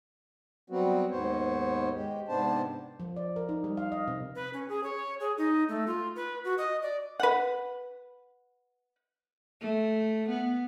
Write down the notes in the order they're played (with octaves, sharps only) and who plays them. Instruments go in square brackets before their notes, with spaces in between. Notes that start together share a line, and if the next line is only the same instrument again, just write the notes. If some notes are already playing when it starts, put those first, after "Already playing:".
[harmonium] F#3 G3 B3 C4 F#4
D#2 G#2 B3 C5 C#5
G#3 G4
G#2 C3 B3 D4 C5 A5
[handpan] F3
D5
A#4
D#4
G3
F5
D#5
C3
[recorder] B4
C#4
G#4
C#5
G#4
D#4
A3
F4
B4
F#4
D#5
D5
[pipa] B4 F#5
[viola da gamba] A3
B3